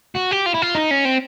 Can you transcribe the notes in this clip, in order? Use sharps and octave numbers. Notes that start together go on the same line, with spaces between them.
F#4
G4
F4
E4
F4
D#4
C#4
C4